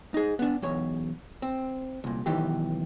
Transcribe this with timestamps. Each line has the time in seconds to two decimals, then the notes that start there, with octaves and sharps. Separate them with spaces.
0.14 D#4 G#4
0.39 B3 D4
0.62 B1 E2 C#5
1.42 C4
2.04 C2 A#2
2.26 B1 D#3 E3 G4